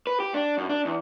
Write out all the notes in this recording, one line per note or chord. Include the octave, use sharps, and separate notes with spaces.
B4
G4
D4
F#2
D4
E2